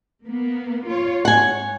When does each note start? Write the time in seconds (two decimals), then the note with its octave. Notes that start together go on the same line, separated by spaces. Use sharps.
0.25 A#3 B3
0.87 F4 C#5
1.25 G#2 C#5 F#5 G#5